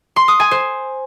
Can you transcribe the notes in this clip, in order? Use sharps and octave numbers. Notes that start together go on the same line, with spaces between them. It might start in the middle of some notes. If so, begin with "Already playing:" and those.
C6
D#6
G#5
C5